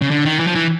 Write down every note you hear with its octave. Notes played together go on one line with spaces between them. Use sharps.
C#3
D3
D#3
E3
F3
E3